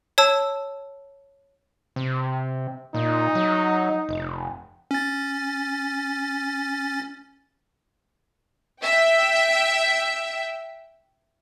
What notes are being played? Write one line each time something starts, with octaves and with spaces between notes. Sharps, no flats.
C#5 A5 E6
C3
A#2 D#4
F#3
F1
C#4 A6
E5 G5